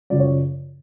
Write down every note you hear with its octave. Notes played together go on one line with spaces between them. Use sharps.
F#2 C#3 F3 D5
C#5